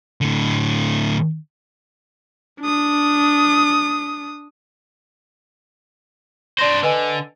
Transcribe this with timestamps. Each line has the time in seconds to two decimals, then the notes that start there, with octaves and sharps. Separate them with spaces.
0.21 A2 D3
2.60 D4 D#6
6.58 D4 C5 D5 C6 A#6
6.83 D3 B4 D#5 G#5